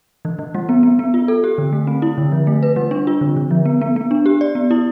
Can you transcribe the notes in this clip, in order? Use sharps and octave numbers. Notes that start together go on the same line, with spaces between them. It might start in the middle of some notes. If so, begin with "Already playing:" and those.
E3
E3
G3
B3
B3
B3
F4
A4
G4
D3
A3
C4
E4
D3
F3
A3
B4
G3
D4
F4
D3
D3
F3
B3
B3
B3
D4
G4
D5
B3
E4